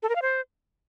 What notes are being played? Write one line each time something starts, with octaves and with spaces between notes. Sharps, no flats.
A4
A#4
F5
C5